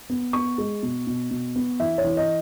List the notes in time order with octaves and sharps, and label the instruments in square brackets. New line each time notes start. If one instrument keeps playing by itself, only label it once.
[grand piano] B3
B3 C#6
G#3
B2
B2
B2
B3
E3 E5
C#5
E3
D#5